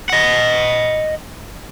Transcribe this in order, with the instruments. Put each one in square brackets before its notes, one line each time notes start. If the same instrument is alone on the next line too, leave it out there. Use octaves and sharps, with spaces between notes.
[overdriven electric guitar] D#5 F#5